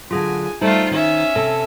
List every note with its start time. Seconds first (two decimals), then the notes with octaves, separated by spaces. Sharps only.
0.11 D3 F#3 F4 G#4 G#5
0.61 G3 A3 D#4 F4 C5
0.91 D#3 C#4 E5
1.36 C3 A4 A5